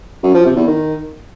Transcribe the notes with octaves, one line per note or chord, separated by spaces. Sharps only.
F#2
F3
C3
E2
D#3